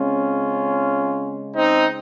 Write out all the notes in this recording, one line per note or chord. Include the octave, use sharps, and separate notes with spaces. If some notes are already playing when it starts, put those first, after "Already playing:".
Already playing: C#3 G#3 C4 C#4 F4
C4 D#4